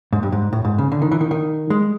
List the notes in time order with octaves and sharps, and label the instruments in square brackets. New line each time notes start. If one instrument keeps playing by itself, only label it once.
[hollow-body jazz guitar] G#2
G2
G#2
A2
G#2
C#3
D3
D#3
E3
D#3
D#3
G#3